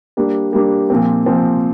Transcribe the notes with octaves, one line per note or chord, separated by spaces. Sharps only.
G3 A#3 D4
G3 A#3 D4
A#2 F3 C4
A#2 F3 C4